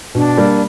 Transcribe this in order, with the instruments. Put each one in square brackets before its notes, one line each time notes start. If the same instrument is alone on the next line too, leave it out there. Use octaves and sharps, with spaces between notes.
[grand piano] B2 [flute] D4
[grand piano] G3 A#3